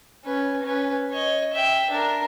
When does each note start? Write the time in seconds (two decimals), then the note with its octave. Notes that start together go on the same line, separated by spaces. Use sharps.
0.24 C#4 B4
0.62 C#4 B4
1.11 C#5 D#5
1.53 E5 G5
1.91 D4 A#4